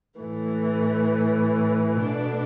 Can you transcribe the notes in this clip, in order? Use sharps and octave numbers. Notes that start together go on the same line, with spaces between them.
A2 E3 A3
B2 A3 D4 A4